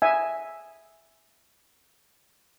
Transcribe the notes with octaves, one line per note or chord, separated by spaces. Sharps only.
E5 G#5